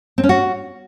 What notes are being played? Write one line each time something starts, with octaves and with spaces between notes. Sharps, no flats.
C4
C#4
F#4